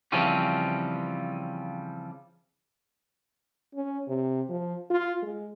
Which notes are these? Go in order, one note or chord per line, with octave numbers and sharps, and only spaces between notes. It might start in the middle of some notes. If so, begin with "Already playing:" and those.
C#3 E3 F3 G3 C4 C#4
C#4
C3
F3
F4
G#3